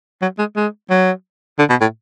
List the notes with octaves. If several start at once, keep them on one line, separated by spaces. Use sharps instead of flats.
F#3
G#3
G#3
F#3
D3
B2
A2